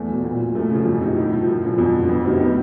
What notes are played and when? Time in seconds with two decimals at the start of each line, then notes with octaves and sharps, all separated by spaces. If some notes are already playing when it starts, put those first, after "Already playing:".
Already playing: E2 A3
0.08 B2 F#3
0.24 A#2
0.39 F3
0.55 F#2 A3
0.70 C#3
0.75 F3
0.85 F2
1.01 C3 D#3 F#3
1.16 A2
1.33 F3
1.47 F#2
1.64 D3 F3
1.78 F2
1.95 D3 F#3
2.09 F2 B3
2.25 C3 D#3 F#3 C4
2.40 A2 B3